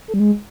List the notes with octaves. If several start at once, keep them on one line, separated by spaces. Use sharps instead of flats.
A4
G3
G#3